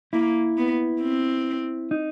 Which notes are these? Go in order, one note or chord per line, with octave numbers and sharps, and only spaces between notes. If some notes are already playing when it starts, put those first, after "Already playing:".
A#3 E4
B3
C4
D#4